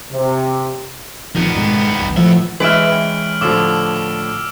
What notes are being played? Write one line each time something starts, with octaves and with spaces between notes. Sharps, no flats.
C3
D1 D#3 F3 B3
G#2 B2 G#3
F1 C2
A2 F3 B3 E5
E3 G#3 C#4 B4 E5 F6 D7 F#7
G5
A2 D3 F3 D6 E6 E7